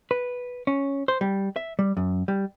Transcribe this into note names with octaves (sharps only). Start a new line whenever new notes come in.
B4
C#4
C5
G3
E5
G3
F#2
G3